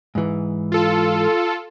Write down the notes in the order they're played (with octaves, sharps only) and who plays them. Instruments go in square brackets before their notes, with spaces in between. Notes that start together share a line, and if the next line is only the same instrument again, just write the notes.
[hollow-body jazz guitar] G#2 E3
[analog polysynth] F4 A4